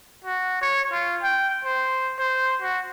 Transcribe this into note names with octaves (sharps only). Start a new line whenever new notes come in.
F#4
C#5
F4
G5
C5
C5
F#4